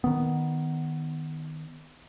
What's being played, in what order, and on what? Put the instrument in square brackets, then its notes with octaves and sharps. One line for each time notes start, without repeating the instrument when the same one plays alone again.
[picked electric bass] D#3 B3